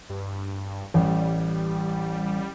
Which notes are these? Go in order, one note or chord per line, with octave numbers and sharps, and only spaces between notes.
G2
A1 G3